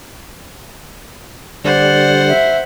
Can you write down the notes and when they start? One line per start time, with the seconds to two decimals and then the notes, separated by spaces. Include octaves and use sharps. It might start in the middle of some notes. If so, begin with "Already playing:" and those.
1.64 D3 G3 C5 D5 F#5
2.28 E5